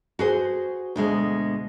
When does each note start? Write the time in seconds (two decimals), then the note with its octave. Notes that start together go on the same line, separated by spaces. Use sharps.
0.19 F#4 G#4 C5
0.96 D2 B2 G#3